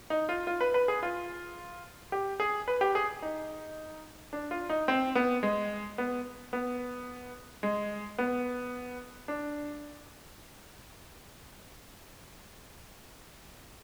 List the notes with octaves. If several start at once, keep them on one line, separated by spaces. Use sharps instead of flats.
D#4
F4
F4
B4
B4
G#4
F4
G4
G#4
B4
G4
G#4
D#4
D4
F4
D#4
C4
B3
G#3
B3
B3
G#3
B3
D4